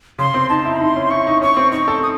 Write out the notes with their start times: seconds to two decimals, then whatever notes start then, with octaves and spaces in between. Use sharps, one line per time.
0.19 C#3 C6
0.34 C4
0.49 D#4 A5
0.65 E4
0.80 D#4 C6
0.96 C#4
1.11 E4 C#6
1.27 D#4
1.41 C#4 C#6
1.57 C4
1.72 D#4 C#6
1.88 A4
2.03 D#6